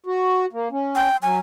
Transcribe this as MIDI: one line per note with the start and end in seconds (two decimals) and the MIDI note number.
0.06 0.46 66
0.53 0.68 58
0.72 1.08 61
0.96 1.17 79
1.22 1.39 54
1.22 1.37 80